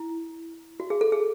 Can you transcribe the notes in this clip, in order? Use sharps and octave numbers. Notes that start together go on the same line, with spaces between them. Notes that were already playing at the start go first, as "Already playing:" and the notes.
Already playing: E4
F#4
G#4
A4
G#4